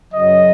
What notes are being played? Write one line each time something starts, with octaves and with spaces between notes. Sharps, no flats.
F#2 C#3 F#3 D#5